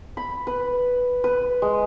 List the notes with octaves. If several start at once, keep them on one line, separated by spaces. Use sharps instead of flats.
B5
B4
B4
G#3